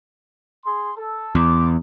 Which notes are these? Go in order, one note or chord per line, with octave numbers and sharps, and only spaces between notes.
G#4 C6
A4
E2 C6 D6